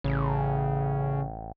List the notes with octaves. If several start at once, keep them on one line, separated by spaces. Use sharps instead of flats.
A1 C#3